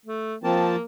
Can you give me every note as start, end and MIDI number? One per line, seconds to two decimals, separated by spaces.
0.06 0.35 57
0.44 0.76 53
0.44 0.85 58
0.44 0.76 60
0.44 0.76 81